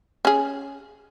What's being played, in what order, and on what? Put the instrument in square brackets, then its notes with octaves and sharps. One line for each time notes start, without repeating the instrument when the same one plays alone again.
[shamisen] C#4 G#4